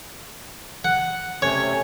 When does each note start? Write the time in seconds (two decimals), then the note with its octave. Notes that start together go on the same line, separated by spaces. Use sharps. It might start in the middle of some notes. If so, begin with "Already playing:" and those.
0.85 F#5
1.42 C3 A3 C#4 C#5